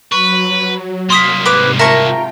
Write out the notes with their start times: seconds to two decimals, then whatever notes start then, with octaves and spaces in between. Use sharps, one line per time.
0.12 F#3 B4 C#6
1.10 C2 A#3 C6 D#6 B6
1.46 G#2 C3 B4 D6
1.79 F4 A#4 E5 G5 A5 C#6 A#6